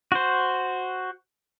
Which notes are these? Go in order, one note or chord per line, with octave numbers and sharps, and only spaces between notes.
F#4 C5